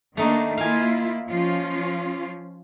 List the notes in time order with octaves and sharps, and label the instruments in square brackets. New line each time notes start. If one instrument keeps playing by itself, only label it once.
[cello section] D#3 A#3 D4 [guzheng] A3 D#4
[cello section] A#3 E4 F4 [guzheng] F5 G#5
[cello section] F3 C#4 F4